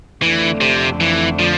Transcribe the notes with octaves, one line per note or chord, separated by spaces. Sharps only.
F2 D3 E3 A3 D4
C3
E3
F3